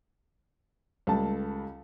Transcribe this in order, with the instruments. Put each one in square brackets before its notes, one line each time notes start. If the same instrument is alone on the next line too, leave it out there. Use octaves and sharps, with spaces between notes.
[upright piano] C#2 G3 A3 A5